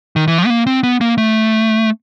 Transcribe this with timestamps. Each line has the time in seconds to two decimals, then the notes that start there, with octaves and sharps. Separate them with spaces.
0.16 D#3
0.28 E3
0.38 F3
0.46 B3
0.50 A#3
0.67 C4
0.83 B3
1.01 A#3
1.18 A3